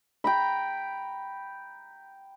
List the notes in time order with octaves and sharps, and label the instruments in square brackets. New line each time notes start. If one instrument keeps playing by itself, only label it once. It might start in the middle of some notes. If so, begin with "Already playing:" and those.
[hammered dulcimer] G5 A#5 B5